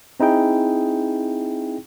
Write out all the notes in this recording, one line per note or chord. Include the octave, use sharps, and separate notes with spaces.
C4 D#4 E4 G#4 G5